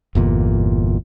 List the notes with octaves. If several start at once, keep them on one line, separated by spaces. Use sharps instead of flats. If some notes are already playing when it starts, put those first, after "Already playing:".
G1 E2 A#2